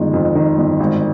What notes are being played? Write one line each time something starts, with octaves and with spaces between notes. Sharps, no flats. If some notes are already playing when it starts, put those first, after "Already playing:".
Already playing: G1 D#3 G#3
F2
D#3
G1
G#1